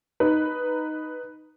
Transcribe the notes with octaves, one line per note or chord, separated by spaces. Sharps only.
D#4 B4